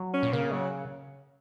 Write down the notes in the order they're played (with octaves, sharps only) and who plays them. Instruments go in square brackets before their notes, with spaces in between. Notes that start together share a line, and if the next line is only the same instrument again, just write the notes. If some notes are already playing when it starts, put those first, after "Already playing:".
Already playing: [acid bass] F#3
[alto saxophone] C#4
[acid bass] A#2
[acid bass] C#3 [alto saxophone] A#3
[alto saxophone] F#3